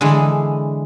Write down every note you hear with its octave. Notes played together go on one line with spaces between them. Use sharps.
D3 E3 G#3